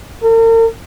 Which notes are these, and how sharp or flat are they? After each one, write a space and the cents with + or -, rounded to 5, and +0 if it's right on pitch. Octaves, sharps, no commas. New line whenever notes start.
A#4 -45